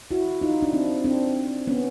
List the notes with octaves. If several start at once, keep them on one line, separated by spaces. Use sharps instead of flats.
E4 F#4
D#4 F4
D4 E4
C4 D4
C4 D4
B3 C#4